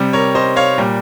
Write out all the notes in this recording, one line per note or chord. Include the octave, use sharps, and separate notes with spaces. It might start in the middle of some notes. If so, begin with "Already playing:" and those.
Already playing: C3 G3
A#4 C#5
C5 D#5
C#5 F5
A#2 G3